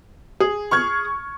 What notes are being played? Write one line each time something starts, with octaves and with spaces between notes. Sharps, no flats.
G#4
C#6 F6 G#6